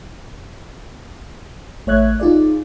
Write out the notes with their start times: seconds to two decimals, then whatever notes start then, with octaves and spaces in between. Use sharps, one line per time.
1.87 A1 A3 C#5 E5 F#6 G#6
2.20 D#4 F4 G#4 D5